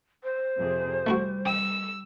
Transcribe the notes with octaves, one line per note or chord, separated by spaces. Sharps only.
C5
F2 C3 G#4
G3 A3 E4 F#4
G5 E6